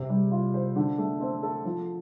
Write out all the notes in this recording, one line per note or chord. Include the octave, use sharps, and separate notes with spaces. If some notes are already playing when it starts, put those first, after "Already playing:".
Already playing: C3
G3
F4
C5
D3
A3
C4
A4
F3